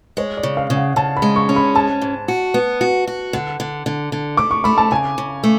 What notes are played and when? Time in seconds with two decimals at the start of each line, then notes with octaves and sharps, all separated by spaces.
0.17 G#3 C#5
0.37 D5
0.43 C#3
0.57 F5
0.70 C#3
0.76 F#5
0.96 C#3 A5
1.17 B5
1.22 G#3
1.36 C#6
1.49 C#4
1.56 B5
1.75 G#2 A5
2.02 G#2
2.28 F#4
2.54 B3
2.81 F#4
3.07 F#4
3.33 D3 F#5
3.60 D3
3.86 D3
4.12 D3
4.37 A3 D6
4.51 C#6
4.64 A3 B5
4.78 A5
4.91 C#3 G#5
5.18 C#3
5.44 A3